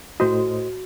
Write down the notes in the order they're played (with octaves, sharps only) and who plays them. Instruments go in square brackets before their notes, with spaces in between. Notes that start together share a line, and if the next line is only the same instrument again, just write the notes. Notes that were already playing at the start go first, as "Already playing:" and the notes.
[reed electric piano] A2 C5 D#5 [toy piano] F#4